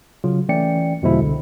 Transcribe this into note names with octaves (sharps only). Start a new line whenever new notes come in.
C#3 F#3 F4
E3 A3 C#4 D5 G5 C#7
E2 B2 D3 F3 G#3 E4
C2 D3